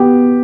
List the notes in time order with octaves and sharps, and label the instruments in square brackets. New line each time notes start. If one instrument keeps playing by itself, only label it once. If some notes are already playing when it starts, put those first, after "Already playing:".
Already playing: [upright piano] B3 G4